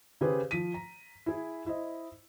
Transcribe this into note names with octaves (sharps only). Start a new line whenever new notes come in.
C#3 G4 G#4 B4 C5
F3 B6 D#7
A#5
E4 G#4
E4 C5 D#5